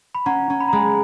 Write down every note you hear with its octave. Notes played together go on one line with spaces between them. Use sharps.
B5
C#4 F#5 A#5
C#4
B5
A#5
G#3 G#5 B5